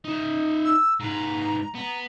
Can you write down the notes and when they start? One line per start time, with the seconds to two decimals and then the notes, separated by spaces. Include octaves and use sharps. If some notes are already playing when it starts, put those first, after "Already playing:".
0.05 D#4 E5
0.64 E6
1.00 G#2 B4 A#5
1.75 B3 A#5